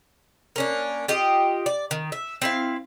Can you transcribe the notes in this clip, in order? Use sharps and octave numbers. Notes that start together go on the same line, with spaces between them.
A#3 C#4 D4
F4 G4 D#5
D5
D#3
E5
C4 E4 F5